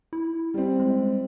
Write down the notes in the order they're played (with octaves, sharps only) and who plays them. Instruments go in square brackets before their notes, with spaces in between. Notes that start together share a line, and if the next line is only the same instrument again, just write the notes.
[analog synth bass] E4
[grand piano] G3 C4
[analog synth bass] G#3